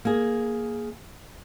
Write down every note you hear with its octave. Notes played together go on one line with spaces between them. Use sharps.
A#3 G#4